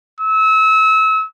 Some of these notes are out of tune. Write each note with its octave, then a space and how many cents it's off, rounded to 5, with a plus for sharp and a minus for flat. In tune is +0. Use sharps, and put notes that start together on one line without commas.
E6 -30